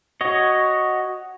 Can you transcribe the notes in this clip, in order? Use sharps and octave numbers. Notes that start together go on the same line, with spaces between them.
F#4 C#5 D#5